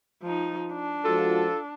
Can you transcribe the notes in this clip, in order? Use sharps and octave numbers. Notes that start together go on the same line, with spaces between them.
F3 D#4
D4
F3 G#3 F4 F#4 A4